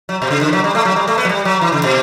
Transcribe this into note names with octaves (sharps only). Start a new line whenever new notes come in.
F#3
B2
C#3
D3
E3
F#3
G3
A3
F#3
G3
A3
B3
F#3
G3
F#3
E3
C#3
B2